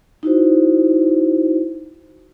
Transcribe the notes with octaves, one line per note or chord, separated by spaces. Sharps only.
D#4 E4 F#4 C5